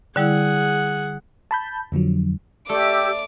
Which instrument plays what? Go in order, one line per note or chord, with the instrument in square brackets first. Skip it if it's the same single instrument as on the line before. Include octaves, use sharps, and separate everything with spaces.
[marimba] D3 G3 E4 [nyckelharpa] G#4 F#5
[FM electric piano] A5 B5 G6
F2 D3 F3 F#3
[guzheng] A3 [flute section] G4 E6 [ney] D5 [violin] D6